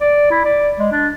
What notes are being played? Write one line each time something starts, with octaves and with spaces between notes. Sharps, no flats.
D5
E4
D5
G#3
D4